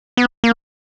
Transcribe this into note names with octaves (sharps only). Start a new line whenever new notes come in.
B3
A#3